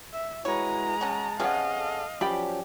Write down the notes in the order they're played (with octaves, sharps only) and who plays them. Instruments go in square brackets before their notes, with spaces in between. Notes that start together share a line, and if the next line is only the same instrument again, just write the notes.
[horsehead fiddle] E5
[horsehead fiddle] G#3 A#5 [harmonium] E4 F#4 B4 [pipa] C#5
[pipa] C#4 F#4 [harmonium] A5
[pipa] C3 B3 C#4 [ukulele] G#4 F#5 [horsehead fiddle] D#5 F5
[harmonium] A4
[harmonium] F3 F#3 C#4 [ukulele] G4 D5 G5 [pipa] B5